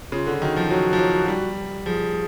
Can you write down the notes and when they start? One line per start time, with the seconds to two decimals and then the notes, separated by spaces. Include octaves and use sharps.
0.12 C#3 F4
0.27 D3
0.42 D#3 F#4
0.56 F3
0.70 F#3 F#4
0.93 F3
0.99 F#3
1.28 G3
1.86 F3 G#4